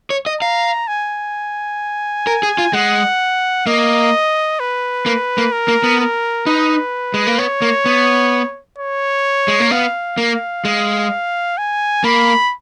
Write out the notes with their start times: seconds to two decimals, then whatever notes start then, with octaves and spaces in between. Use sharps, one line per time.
0.10 C#5
0.26 D#5
0.41 F5 A#5
0.88 G#5
2.27 A#4
2.43 G#4
2.58 F4
2.73 G#3 F#5
3.67 A#3 D#5
4.60 B4
5.06 A#3
5.38 A#3
5.53 A#4
5.68 A#3
5.84 B3
6.00 A#4
6.46 D#4 B4
7.14 G#3
7.27 A#3
7.38 B3 C#5
7.62 A#3
7.86 B3
8.78 C#5
9.48 G#3
9.60 A#3
9.71 B3 F5
10.18 A#3
10.65 G#3
11.58 G#5
12.04 A#3 B5